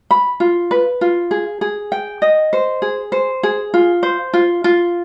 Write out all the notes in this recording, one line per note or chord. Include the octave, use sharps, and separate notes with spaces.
B5
F4
B4
F4
G#4
G#4
G5
D#5
C5
G#4
C5
G#4
F4
C5
F4
F4